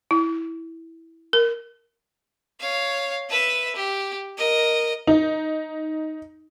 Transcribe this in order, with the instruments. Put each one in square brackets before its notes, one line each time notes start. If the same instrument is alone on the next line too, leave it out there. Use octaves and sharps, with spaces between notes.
[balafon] E4
A#4
[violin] C#5 F5
B4 E5
G4
A#4 D#5
[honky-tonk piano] D#4